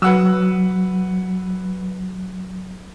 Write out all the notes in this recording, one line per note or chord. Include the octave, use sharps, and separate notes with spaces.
F#3 B4 F#5 E6